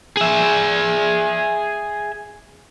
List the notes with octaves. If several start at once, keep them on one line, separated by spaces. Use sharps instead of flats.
G#4 E5